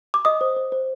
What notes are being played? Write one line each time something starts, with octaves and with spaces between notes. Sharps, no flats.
D6
D#5 D#6
C5
C5
C5